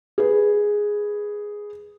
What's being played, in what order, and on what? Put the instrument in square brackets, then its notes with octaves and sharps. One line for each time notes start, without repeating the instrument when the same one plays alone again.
[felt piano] G#4 B4